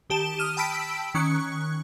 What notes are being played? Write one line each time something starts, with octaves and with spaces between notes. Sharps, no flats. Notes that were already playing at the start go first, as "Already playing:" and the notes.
D#3 G4 A5 E7
D#6 F6 D#7
G5 A5 B5 E6 B6 D7
D#3 C#4 C#6 F#6